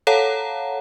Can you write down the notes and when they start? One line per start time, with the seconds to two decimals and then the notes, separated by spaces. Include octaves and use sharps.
0.07 A4 C#5 F5 F#5 A5 A#5